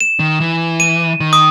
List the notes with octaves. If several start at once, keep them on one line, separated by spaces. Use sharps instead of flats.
E7
D#3
E3
D#7
D#3
D#6